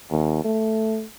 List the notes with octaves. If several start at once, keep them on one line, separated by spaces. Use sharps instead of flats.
D#2
A3